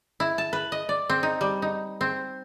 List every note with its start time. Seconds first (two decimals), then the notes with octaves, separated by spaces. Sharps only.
0.20 E4
0.38 A5
0.53 B4
0.72 D#5
0.89 D5
1.09 C4
1.23 D#4
1.41 G3
1.62 D#4
2.01 C4